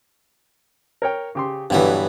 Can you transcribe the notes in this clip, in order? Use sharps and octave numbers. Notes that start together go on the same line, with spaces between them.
A#4 C#5 G5
C#3 G4 C6
G2 B2 D3 E3 F#3 B3